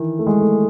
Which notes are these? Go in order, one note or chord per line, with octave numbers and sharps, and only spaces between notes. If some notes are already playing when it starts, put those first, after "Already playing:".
Already playing: D#3 E3
A3
G#3
A3